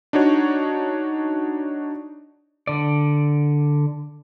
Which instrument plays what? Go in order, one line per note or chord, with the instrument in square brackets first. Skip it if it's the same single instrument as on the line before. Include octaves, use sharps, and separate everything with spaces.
[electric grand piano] D4 D#4 F#4 C#5
[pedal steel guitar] D3 D5